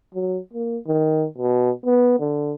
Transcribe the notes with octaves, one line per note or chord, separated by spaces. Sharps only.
F#3
A#3
D#3
B2
B3
D3